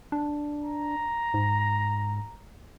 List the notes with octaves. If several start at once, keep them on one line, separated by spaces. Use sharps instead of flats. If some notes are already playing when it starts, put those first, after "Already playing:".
D4
A#5
G#2